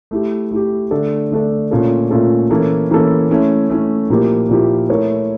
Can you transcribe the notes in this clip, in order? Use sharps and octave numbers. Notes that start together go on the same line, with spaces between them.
A3 E4 G4
A3 E4 G4
D3 A3 D4 A4
D3 A3 D4 A4
A#2 A3 C#4 F4 A4
A#2 A3 C#4 F4 A4
E3 A#3 C#4 E4 A4
E3 A#3 C#4 E4 A4
A3 C#4 E4
A3 C#4 E4
A#2 F3 A#3 E4 G4
A#2 F3 A#3 E4 G4
A3 E4 A#4 C#5